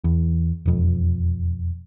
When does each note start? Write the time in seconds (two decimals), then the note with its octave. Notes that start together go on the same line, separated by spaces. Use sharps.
0.04 E2
0.66 E1 F2